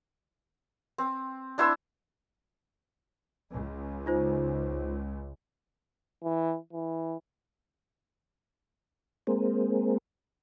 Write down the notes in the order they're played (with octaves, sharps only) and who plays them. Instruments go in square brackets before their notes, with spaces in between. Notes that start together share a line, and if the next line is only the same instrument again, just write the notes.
[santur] C4
D4 E4 C5 E6
[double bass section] C#2
[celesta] D#4 F4 C5
[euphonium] E3
E3
[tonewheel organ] G#3 A#3 C4